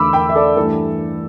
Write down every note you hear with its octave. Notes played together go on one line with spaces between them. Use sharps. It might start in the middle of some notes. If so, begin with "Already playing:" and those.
Already playing: E2 D3 A3 B5 D6 E6
G5 B5
E5
A4 D5
G2 E3 A3 A4